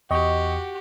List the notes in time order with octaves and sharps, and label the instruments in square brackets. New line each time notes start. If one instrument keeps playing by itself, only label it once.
[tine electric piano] E2 G5 C#6 [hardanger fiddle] F#4 G4 [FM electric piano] D#5